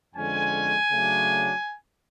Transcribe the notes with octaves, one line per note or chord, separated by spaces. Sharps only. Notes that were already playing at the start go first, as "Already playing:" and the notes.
F2 D3 G#3 C#4 G#5
C#3 F#3 A3 D4